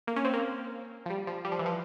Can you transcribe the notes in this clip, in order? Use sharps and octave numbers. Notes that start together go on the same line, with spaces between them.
A#3
C#4
C4
A#3
F3
G3
F3
G3
F3
E3
F3